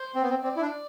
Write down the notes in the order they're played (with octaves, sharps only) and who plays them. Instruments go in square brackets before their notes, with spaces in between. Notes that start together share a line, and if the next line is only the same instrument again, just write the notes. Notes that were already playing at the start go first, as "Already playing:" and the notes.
Already playing: [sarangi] C5
[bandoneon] C4
B3
C4
[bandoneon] C4 [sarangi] D5
[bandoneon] E4
D4